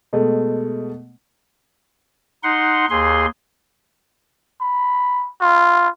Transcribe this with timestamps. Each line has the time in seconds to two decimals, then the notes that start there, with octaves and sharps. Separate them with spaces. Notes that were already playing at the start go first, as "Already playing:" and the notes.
0.13 B2 G#3 A3
2.43 D#4 F#5 C6
2.90 D#2 G#4 C6
4.61 B5
5.41 F4